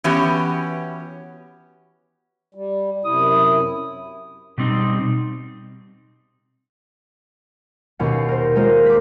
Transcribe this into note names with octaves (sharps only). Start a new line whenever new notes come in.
E3 B3 C#4 F#4 G4
G3
F#2 C3 E4 D#6
B2 G3 C4 D#4
D#2 B2 C#4 F#5 C7
A#4 C5
G#3 A#3 D#4 F4 A#4 C5
D6 B6